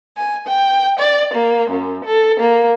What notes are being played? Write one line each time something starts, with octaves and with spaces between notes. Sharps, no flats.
G#5
G5
D5
A#3
F#2
A4
A#3